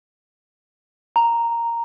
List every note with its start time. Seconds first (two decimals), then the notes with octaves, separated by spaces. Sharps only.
1.16 A#5